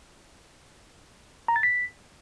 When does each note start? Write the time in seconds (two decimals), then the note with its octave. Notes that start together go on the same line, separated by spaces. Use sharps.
1.48 A#5
1.56 A6
1.63 B6